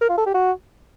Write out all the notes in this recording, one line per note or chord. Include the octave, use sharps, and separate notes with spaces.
A#4
F4
A4
G4
F#4